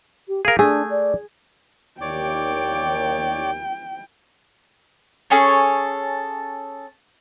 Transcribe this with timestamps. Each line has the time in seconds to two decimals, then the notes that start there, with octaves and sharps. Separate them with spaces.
0.27 G4
0.45 G#4 A#4 F5
0.59 A3 D4 G#4
0.89 D5
2.01 D#2 C#5 D5 G5 D6
5.30 C#4 G#4 A4 C#5